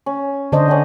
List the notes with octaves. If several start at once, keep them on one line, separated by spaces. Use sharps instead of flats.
C#4
D3 D4 C5 D#5
C#4 D4 F#5